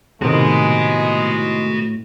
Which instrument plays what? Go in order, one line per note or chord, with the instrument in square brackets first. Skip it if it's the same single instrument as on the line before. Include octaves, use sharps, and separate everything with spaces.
[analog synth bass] A2 [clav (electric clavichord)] C3 D#3 [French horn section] G#3 [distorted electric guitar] F#4 B4